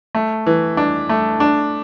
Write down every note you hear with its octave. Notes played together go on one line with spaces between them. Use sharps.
A3
E3
D4
A3
D4